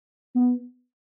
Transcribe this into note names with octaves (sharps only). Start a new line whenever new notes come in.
B3